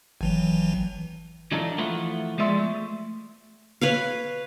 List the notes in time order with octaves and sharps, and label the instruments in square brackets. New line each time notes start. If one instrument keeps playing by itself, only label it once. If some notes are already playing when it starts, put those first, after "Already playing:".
[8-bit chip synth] G#1 E3 F#3
[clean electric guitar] E3 F#3 D4 D#4 F4 A4
E3 F3 A3 B3 F4 B4
F3 G#3 B3 D5 E5 C6
A3
[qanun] B4 C#5 F5